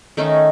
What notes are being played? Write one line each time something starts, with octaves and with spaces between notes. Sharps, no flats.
D#3 A3 C#4 D#4